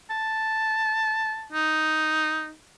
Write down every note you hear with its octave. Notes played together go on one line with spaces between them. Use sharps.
A5
D#4